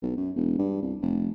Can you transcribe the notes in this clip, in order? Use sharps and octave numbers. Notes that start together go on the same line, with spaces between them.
B1
F#2
E1
G2
C2
F1